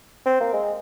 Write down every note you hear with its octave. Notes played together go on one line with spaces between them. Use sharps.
C4
A#3
G#3